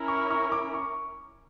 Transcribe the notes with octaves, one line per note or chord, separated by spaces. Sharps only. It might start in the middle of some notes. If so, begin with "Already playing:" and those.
Already playing: C#4 E4 A#4
C#6
C#6
D6
C#6